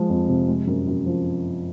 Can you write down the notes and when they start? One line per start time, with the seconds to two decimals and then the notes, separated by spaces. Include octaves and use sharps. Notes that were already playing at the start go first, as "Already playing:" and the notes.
Already playing: F3 G#3
0.09 F2
0.28 C3
0.48 G#3
0.67 F#2
0.87 F#2
1.06 F3